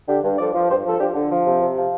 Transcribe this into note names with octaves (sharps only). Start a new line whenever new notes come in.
D3 D4 G4
G2
F3 A4 D5
F3
G2 G4 C5
F3 A4
F3 D4 G4
D3
F3
C3
C3
F3